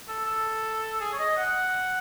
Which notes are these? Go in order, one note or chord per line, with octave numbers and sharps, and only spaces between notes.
A4
A4
G#4
C#5
D#5
F#5